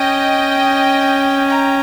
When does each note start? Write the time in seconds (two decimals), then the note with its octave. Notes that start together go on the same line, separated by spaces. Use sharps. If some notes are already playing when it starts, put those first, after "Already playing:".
Already playing: C#4 D#5 G5
1.46 G5 A#5